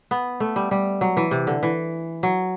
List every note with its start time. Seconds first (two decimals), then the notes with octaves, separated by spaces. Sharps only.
0.11 B3
0.40 A3
0.56 G3
0.71 G3
1.01 F#3
1.17 E3
1.31 C3
1.47 D3
1.63 E3
2.23 F#3